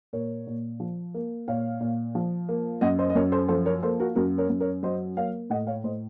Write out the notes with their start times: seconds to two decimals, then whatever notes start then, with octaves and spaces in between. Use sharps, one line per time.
0.13 A#2 A#4 C#5
0.47 A#2
0.80 F3
1.14 A#3
1.48 A#2 C#5 F5
1.81 A#2
2.15 F3
2.49 A#3
2.81 F#2 D#5 F#5
2.99 C5 D#5
3.10 D#5
3.15 F#2 A#4 C#5
3.32 A4 C5
3.48 F3 A4 C5
3.66 A#4 C#5
3.83 A#3 A4 C5
4.00 F#4 A#4
4.16 F#2 F#4 A#4
4.38 A#4 C#5
4.50 F#2
4.60 A#4 C#5
4.83 F#3 C5 D#5
5.17 A#3 C#5 F5
5.50 A2 D#5 F#5
5.67 C#5 F5
5.84 A2 C5 D#5